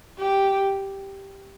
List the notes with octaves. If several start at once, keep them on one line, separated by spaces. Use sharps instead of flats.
G4